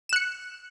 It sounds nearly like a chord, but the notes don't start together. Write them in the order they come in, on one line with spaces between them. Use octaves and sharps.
E7 F#6 C#7